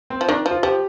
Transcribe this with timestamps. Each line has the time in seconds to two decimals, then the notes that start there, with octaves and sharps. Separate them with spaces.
0.10 C4
0.21 F3
0.28 D#3 D4
0.46 F3
0.51 F4
0.63 F3 G4